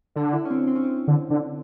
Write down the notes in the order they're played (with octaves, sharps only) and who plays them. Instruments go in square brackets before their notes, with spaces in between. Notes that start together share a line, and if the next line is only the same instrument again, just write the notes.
[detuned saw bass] D3 [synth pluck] D4
[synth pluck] E4
C#4
C4
C4
C#4
C4
[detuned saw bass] D3
D3